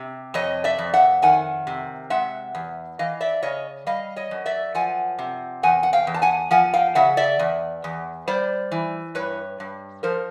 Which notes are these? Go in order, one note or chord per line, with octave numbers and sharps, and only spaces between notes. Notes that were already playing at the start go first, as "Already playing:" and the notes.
Already playing: C3
F2 C#5 D#5
D5 E5
F2
E5 F#5
D#3 F#5 G#5
C3
G#3 E5 F#5
E2
E3 D#5 F5
D5 E5
C#3 C#5 D#5
G3 D#5 F5
C#5 D#5
F#2
D5 E5
F3 F#5 G#5
C3
E2 F#5 G#5
F#5
F5 G5
E2
A5
F#5 G#5
F3 F#5 G#5
F5 G5
C#3 E5 F#5
D5 E5
E2
E2
G3 C5 D5
E3
G2 B4 C#5
G2
F3 A#4 C5